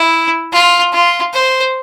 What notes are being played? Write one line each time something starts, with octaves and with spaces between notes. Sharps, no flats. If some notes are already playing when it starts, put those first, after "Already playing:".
Already playing: E4
F4
F4
C5